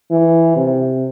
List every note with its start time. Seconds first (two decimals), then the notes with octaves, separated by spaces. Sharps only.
0.11 E3
0.56 C3